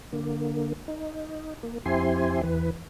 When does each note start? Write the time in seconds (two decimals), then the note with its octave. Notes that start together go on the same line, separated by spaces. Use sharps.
0.13 D3 A#3
0.88 D#4
1.63 A#3
1.86 F2 C4 E4 G4 G#5 C6
2.43 E2 E3 B4